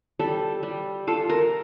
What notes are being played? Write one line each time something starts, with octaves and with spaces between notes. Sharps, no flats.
G3 A4
G3
F4 A4
A#4